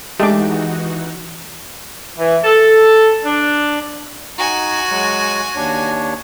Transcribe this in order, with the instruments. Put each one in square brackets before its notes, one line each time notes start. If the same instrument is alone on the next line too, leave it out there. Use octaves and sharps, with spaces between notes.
[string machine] E3 D#4 F#4 [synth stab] G#3 [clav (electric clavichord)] A3 D4 [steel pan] G4 D6
[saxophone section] E3
A4
D4
[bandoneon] D#4 [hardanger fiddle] F#4 G#5
[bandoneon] F#3 G#3
D#2 D4 C#5